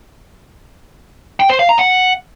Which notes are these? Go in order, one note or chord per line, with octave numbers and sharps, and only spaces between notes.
G5
C5
F5
A#5
F#5